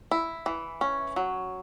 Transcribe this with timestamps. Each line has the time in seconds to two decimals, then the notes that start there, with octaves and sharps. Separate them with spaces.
0.11 E4
0.46 E3
0.81 C#4
1.16 F#3